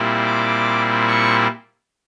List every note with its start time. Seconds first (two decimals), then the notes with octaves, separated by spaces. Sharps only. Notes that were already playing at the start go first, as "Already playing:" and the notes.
Already playing: A#2 G3 C4 E4
0.26 D6
1.08 C#6